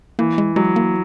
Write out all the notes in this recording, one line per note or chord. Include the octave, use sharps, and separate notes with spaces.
E3 A#3
G#3
F#3 G#3
A#3